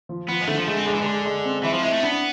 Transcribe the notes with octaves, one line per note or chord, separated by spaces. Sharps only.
F3
F3 B3
G#3
D3 A3
F3
G#3 A3
C4
D3 G#3
E3
D3 G#3
G#3
C4
E3 E4
F3
G#3 E4
A3
B3 D4